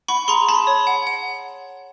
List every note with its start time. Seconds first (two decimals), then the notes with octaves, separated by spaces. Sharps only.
0.08 F#5 B5 C#6
0.28 G#4 A#5 C6
0.49 G#4 A5 B5
0.67 C#5
0.87 F#5
1.07 F#5